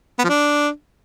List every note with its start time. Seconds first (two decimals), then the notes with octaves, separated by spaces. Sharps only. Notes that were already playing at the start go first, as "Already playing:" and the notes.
0.19 B3
0.24 F3
0.29 D4